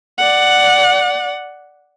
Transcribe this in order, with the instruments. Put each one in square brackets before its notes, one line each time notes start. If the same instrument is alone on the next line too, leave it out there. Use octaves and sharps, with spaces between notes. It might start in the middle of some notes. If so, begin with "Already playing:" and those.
[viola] D5 F#5